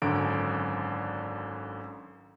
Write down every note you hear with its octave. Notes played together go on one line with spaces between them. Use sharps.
G#1 F#2 D3 D7